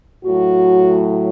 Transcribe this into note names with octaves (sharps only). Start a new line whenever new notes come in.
A2 F#3 F#4